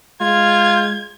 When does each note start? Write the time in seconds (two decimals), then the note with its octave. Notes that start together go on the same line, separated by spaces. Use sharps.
0.21 G#3 F4 G#6